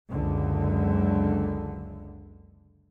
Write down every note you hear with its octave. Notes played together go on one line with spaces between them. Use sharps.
F#1 C#2 D3